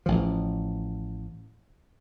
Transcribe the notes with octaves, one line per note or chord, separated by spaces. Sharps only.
A1 F3